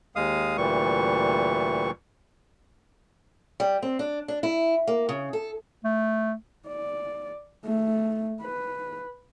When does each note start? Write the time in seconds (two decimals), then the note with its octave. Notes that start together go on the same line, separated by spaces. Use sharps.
0.16 D#2 G#3 F5 D#6
0.57 D2 A#2 E3 G3 C#6
3.60 G3
3.82 C4
3.99 D4
4.28 D4
4.43 E4
4.87 A#3
5.09 C#3
5.33 A4
5.84 A3
6.68 D5
7.66 A3
8.42 B4